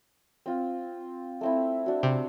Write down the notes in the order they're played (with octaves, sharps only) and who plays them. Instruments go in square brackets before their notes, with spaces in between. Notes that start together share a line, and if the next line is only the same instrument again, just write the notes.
[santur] C4 F4 F5
A3 C4 E4
D4 F#4
[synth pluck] C3